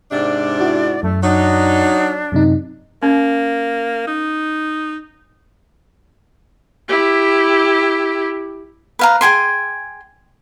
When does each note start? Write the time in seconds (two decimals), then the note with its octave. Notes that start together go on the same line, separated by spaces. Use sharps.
0.11 G#2 C3 D4 D5
0.60 E4 F#4
1.03 F#2 A3
1.23 F#3 D4 D#4
2.32 F#2 C3 D#4
3.03 A#3 C#4
4.07 D#4
6.88 E4 G4
8.99 B4 F5 A#5
9.21 G#4 G5 G#5 C6